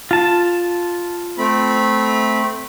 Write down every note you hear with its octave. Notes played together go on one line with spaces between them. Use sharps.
F4 A5
A3 C4 B5